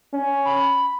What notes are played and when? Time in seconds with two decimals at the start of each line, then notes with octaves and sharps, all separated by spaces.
0.13 C#4
0.45 B5